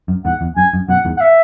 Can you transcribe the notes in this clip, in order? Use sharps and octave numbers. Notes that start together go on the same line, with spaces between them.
F#2
E2 G#2 F#5
E2
F#2 G#5
F#2
F#2 B2 F#5
E2 G#2
F#5
E5